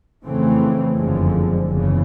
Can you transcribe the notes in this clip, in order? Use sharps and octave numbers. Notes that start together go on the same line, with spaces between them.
F2 C#3 E3 A3 C4
F#1 F2 D3 F3 G#3
F#1 E2 C#3 E3